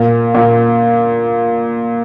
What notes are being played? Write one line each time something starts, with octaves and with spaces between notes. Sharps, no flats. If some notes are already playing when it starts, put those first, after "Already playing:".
Already playing: A#2
A#2